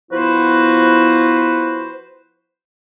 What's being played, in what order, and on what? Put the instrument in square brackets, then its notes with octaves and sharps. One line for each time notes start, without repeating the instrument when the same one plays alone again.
[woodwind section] F3 B3 E4 F#4 B4 C5